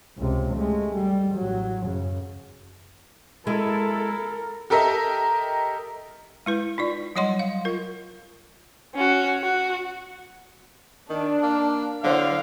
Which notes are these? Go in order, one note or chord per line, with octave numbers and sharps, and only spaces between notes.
C#2 C3
G#3 A3
G3
A1 F#3
F#2 C#3
G#3 E4 A4 A#4
G4 A4 A#4 D#5 E5
G#3 E4 B4
D#4 F4 D5
F#3 G3 C#5 D#5 F#5 C6
F5
F4 A#4
C#4 F#4
F#4
D#3 D4
A#3
D3 F#3 E4 C5 F5 F#5